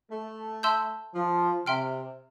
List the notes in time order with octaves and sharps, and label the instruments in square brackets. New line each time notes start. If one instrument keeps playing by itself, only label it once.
[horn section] A3
[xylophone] E5 A5 C6 E6 G6
[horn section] F3
[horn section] C3 [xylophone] E5 G5 C6 F6